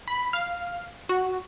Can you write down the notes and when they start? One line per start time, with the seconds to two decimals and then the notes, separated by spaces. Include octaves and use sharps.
0.08 B5
0.33 F5
1.09 F#4